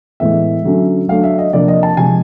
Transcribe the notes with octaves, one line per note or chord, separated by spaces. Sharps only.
A2 E3 G#3 B3 E5
D3 F#3 A3 C#4
F#3 A3 D4 F5
E5
D#5
C3 F3 A#3 D4 D5
D#5
A5
C3 F3 G#3 G#5